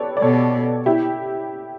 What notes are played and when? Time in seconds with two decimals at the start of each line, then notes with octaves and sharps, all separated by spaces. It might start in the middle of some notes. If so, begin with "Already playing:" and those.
Already playing: G4 A4 B4 C#5 D5
0.17 D5
0.22 B2 A4 C#5
0.86 E4 G4